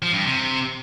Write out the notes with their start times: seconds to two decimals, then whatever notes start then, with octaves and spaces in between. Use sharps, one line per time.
0.02 F3
0.14 G2
0.25 C3